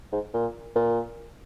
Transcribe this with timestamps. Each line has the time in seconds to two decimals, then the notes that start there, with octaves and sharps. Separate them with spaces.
0.13 G#2
0.34 A#2
0.76 A#2